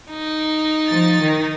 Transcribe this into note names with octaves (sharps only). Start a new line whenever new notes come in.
D#4
F3 A6
D#3